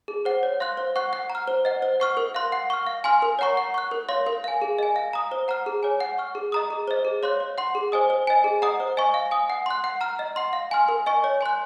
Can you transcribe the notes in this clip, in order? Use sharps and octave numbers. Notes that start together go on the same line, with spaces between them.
G#4
C5 F#5
C#5
F5 C6 F#6
C5
F#5 C#6 F#6
F#5
A#5
F6
C5
D#5 F#5
C5
F#5 C#6 F6
A#4
F5 C6 F#6
F#5
C#6 F6
F5
G#5 C6 F6
A#4
C#5 F#5 A#5 C#6
F#5
C#6 F#6
A#4
C#5 F5 C6
A#4
F5 G#5
G#4
D#5 G#5
F5
A#5 D#6
C5
F#5 A#5 F6
G#4
C#5 G#5
F#5
C#6 F6
G#4
D#5 A#5 D#6
G#4
C5 D#5
G#4
C#5 F5 C6 F#6
C#5
F#5 C6
G#4
C5 D#5 G#5 D#6
C5
D#5 G#5
G#4
D#5 F#5 A#5 D#6
C5
D#5 G#5 C#6
F5
G#5 D#6
F#5
C6 F#6
F#5
A#5 F6
D#5
F#5 C6
F5
G#5 C6 F6
A#4
D#5 G#5 C#6
C#5
G#5 C6 F#6